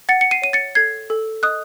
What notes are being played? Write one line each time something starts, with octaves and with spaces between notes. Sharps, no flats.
F#5 A6 C#7
C#7
C7 D#7
C#5 D#7
A6 C#7
A4 G#6 C7
A4
D#5 D#6 F#6